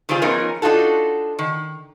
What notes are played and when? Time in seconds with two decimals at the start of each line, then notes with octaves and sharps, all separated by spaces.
0.09 D#3 G3 C4 F4 G#4
0.22 F3 B3 C#4 D#4 G#4 A#4
0.62 D4 D#4 F4 F#4 A4
1.39 D#3